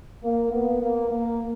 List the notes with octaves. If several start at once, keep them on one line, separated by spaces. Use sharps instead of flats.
A#3
B3
A#3
A#3